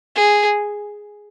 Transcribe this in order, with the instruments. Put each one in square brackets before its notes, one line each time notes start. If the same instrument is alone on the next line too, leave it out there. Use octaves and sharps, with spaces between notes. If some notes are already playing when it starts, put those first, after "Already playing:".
[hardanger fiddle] G#4